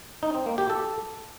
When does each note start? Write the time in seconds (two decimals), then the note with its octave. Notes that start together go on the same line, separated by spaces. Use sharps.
0.23 D#4
0.34 C4
0.46 A#3
0.58 G4
0.70 A4